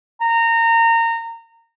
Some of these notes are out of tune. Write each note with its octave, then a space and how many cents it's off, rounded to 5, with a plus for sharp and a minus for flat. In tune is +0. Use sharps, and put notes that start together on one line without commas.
A#5 -25